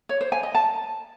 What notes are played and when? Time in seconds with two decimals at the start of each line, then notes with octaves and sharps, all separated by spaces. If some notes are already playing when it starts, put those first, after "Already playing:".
0.09 C#5
0.21 C5
0.32 G#5
0.43 D#5
0.55 A5